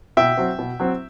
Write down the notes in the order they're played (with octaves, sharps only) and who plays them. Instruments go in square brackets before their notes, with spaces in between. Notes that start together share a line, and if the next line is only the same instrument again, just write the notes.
[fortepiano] B2 E5 G5
F#3 C4
B2
F#3 C4